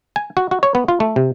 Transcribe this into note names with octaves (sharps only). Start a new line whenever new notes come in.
G#5
F#4
F#4
C#5
B3
F4
A3
C3